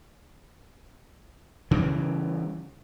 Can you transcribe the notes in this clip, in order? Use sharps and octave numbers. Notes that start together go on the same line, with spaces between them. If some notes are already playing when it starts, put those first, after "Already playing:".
C#3 E3 G3